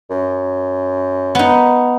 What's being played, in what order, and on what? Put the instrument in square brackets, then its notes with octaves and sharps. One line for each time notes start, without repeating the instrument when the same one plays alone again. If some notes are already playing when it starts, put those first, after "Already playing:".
[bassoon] F#2
[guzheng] B3 D#4